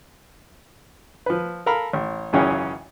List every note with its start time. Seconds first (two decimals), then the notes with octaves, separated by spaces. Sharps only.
1.26 F3 B4
1.66 A4 A#4 F5 A#5 B5
1.93 A1
2.33 G#1 F#2 C#3 E3 C#4 F5